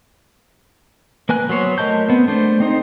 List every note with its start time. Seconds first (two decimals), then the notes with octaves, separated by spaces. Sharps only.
1.29 A#3 B4 G#5 F#6
1.49 F#3 B3 C5 C#5
1.78 A3 A#4 D#5 A5 G6
2.09 B3 C4
2.28 A3 D4 C5
2.60 C4 D#4 C5